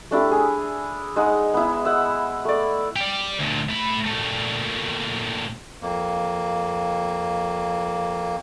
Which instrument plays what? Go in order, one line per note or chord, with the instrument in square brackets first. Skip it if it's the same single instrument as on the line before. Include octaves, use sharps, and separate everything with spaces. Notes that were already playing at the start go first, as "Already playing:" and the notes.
[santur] A3 D4 E4 G4
G#4
G#3 D#4 F#5
B3 E4
E5 F#5
A3 D5
[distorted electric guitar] G4 D5
D2 A#2
A3 B5
A#2 A3
[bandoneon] F2 A#3